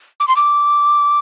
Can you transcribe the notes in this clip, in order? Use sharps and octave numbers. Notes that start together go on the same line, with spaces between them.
D6
C6
D6